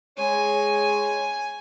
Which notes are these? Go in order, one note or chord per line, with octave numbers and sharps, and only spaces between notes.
G#3 C#5 G#5